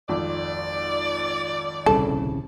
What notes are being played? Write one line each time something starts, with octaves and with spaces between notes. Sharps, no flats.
G#1 F2 D5
D#1 C2 C#3 A4